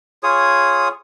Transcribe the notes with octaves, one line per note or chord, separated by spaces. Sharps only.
F4 G#4 C#5 D#6